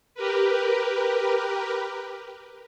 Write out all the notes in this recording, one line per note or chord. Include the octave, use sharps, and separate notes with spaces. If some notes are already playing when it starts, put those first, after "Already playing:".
G4 A#4 B4